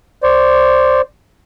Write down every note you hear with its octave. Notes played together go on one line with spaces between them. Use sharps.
C5 D5